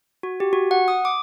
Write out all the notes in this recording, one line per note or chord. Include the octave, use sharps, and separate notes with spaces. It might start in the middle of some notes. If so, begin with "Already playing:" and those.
F#4
G4
F#4
F#5
D#6
D6